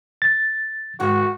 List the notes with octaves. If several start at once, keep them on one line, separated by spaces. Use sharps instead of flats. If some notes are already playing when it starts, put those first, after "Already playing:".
A6
G#2 D#3 F#4 F#5